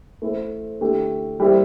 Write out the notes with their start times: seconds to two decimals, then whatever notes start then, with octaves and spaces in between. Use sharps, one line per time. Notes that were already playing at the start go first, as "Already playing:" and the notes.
0.22 A3 E4 A4 C5
0.81 D3 A3 E4 G4
1.40 G3 A#3 E4 G4 C5